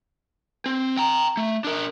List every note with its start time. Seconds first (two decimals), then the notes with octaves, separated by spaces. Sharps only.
0.66 C4
0.97 G5 A#5
1.37 A3
1.64 D4 A#4